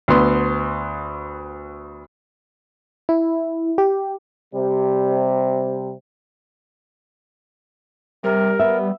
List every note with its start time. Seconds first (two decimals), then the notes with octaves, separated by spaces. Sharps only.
0.08 D2 B3 C6
3.09 E4
3.78 G4
4.54 C3 G3
8.24 C3 G3 A#4
8.59 B3 E5